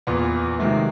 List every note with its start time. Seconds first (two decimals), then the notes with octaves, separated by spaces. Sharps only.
0.07 E2 A#2 B3
0.59 C3 D#3 F#3 G#3 A3